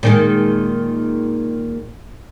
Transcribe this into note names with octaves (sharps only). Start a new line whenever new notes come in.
A#2 D#3 G#3